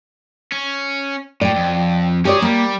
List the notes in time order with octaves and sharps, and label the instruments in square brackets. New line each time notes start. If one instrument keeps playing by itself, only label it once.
[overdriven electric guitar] C#4
[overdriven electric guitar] A2 [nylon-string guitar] D5 G5
[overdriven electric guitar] F2
[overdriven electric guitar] C#4 G#4 [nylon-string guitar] G4 C#5 D5
[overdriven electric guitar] G3 [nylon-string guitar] A#3